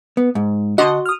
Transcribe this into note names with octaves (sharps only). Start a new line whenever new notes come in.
B3
G#2
D3 F#4 D#5 C6
D#6 F6